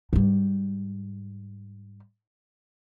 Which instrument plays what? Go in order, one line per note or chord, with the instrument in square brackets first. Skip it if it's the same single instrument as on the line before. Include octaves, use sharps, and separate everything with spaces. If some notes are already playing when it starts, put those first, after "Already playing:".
[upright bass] G#2 G3